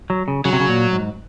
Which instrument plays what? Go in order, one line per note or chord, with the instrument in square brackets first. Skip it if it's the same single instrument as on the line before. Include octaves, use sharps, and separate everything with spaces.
[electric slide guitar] F#3
C#3
[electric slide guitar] C#3 [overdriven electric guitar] F#3
[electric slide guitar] C3
C#3
A#2
G#2